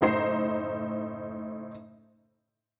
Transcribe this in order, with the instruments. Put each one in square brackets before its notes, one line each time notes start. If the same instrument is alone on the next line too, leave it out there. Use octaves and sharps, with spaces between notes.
[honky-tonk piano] F#1 A2 D#4 C5 C7